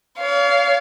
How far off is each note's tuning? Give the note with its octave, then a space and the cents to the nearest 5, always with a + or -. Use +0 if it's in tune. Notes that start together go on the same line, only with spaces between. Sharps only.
C#5 +45 F5 +0